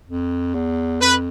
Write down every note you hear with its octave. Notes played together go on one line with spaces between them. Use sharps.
F2
E2
F2 B4